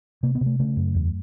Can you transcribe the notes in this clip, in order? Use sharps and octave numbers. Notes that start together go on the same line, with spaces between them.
C3 A#3
B3
C3
A3
C#3 A3
F#2
E2